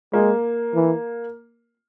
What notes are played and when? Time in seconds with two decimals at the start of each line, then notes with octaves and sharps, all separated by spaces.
0.13 G#3 A#3
0.75 E3